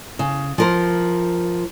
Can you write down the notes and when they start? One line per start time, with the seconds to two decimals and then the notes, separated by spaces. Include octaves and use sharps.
0.19 C#3
0.58 F3 A#4 C5